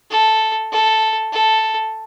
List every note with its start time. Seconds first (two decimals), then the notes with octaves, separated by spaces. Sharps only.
0.10 A4
0.72 A4
1.33 A4